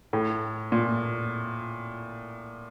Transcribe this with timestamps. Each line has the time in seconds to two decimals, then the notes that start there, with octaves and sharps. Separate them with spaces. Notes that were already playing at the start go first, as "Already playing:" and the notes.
0.13 A2
0.72 A#2